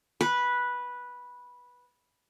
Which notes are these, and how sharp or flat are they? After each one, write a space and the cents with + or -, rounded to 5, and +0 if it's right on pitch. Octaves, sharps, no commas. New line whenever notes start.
B4 -10